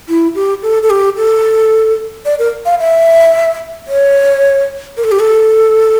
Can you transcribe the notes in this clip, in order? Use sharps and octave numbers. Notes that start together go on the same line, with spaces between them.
E4
G4
A4
A4
G4
A4
D5
A#4
F5
E5
C#5
A#4
A4
G4
A4